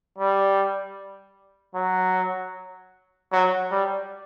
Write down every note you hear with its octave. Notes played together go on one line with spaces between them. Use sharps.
G3
F#3
F#3
G3